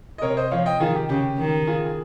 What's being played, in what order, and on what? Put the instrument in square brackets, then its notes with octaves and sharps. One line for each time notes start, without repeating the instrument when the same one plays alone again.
[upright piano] D#5
[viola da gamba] C3 [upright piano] A#4 C#5
[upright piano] C5 D#5
[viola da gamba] F3 [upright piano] C#5 F5
[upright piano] D#5 G5
[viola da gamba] D#3 [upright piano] F4 G#4
[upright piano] G4
[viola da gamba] C#3 [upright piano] G4
[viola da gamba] D#3
[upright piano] F4 G#4
G#4